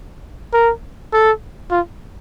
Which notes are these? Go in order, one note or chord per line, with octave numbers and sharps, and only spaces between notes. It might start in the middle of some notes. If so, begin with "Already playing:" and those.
A#4
A4
F4